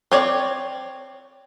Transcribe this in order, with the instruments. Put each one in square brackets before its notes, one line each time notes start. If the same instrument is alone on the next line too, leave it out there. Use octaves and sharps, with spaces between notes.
[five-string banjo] C4 C#5 D5